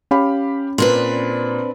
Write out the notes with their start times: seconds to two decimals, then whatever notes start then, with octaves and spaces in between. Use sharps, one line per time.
0.11 C#4 G4 F5 B5
0.78 A#2 C4 D4 B4